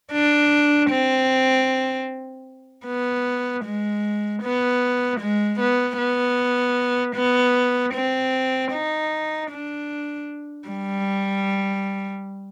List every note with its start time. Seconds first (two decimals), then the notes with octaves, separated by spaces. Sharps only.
0.12 D4
0.90 C4
2.86 B3
3.65 G#3
4.43 B3
5.20 G#3
5.60 B3
5.98 B3
7.15 B3
7.94 C4
8.72 D#4
9.50 D4
10.68 G3